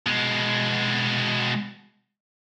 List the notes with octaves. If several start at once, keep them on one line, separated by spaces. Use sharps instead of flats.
B2 G#3